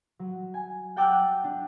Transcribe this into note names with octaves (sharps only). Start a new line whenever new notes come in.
F#3
G#5
F#5 G5 A5 D6 E6 F#6
D4